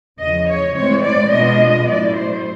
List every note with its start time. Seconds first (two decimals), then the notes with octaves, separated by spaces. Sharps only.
0.19 E2 C#3 F3 D#5
0.48 C#5
0.76 A2 E3 G#3 C4 C#5
1.04 D5
1.32 B2 G#3 B3 D4 F4 D#5
1.89 A2 F#3 A3 C#4 E4 D5
2.16 C5